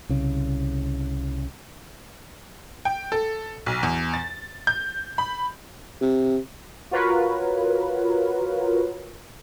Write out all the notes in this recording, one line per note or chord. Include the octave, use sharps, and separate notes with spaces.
C2 C#3
G5
A4
B1
E2
A6
G6
B5
C3
F4 F#4 A#4 B4 C#5